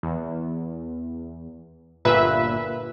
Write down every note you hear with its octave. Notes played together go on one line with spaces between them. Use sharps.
E2
G1 A#2 B4 E5